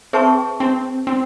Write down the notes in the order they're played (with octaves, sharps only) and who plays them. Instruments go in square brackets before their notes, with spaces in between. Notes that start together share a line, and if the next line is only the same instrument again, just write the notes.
[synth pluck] C4 [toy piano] G#4 B4 E5 A5 C#6
[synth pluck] C4
C4